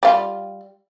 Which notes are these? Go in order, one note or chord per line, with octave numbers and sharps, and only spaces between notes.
G3 F4